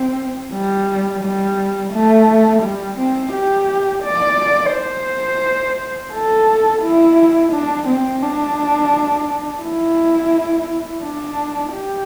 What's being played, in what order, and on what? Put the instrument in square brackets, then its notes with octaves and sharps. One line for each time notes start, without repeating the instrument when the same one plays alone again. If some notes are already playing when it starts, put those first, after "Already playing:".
Already playing: [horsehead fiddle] C4
G3
G3
A3
G3
C4
G4
D5
C5
A4
E4
D4
C4
D4
E4
D4
G4